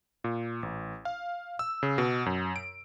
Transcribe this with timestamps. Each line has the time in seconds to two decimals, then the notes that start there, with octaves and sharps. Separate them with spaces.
0.24 A#2
0.63 A1
1.05 F5
1.59 E6
1.83 C#3
1.98 B2
2.26 F#2
2.56 D7